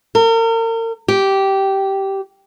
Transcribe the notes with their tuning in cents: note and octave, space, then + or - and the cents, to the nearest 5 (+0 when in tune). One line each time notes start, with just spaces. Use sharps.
A#4 -40
G4 -15